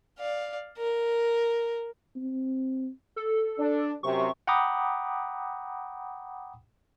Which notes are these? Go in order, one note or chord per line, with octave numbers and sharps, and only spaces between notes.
D5 F5
A#4
C4
A4
D4
F#2 C3 C#6
F#5 G5 A#5 B5 D6 D#6